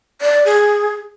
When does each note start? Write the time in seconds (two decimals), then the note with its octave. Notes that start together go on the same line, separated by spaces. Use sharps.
0.22 D5
0.45 G#4